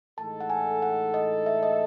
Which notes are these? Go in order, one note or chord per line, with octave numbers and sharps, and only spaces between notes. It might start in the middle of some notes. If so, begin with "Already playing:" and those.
A2 E3 G#3 D#4 A4 A5
F#5
G#5
F#5
D#5
E5
D#5